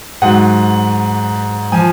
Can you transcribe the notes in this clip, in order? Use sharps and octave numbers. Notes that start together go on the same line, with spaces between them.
G#2 F#3 F#5
F3 G#5